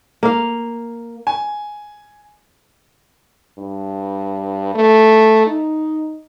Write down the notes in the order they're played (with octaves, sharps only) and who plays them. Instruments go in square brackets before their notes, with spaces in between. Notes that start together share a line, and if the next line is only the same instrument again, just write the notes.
[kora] A#3 F5
[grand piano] G#5
[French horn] G2
A3
D#4